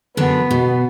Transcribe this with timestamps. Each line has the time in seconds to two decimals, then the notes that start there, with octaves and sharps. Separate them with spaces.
0.17 F#2 D3 B3 D4
0.51 B2